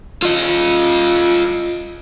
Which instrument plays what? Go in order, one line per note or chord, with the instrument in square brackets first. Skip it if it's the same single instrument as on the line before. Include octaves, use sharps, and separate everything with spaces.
[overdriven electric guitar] F4 D#5